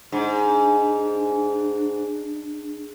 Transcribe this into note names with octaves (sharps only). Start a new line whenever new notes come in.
G#2 D4